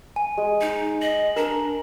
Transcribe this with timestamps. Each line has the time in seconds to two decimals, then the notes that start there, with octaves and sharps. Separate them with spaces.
0.16 G#5
0.37 G#3
0.61 D#4
1.02 D#5 F#7
1.36 D4 A#4